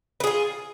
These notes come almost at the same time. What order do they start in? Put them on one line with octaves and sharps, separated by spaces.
B4 G#4 F4